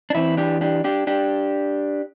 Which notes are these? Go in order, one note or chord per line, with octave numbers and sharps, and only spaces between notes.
D4
E2 E3 C4 E4
D4 G4
D4 G4
D4 G4
D4 G4